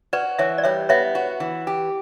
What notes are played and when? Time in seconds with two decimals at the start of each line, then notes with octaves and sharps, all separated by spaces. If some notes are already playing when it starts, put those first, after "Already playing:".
0.13 F#4 B4 D5
0.38 E3 C#5 E5
0.58 D5
0.63 G3 C#5 E5
0.89 B3 C#5 E5
1.15 F#4
1.40 E3
1.67 G4